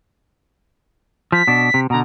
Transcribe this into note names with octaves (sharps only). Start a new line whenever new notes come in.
F3 B6
B2 D4
C3
B2 D3 A#5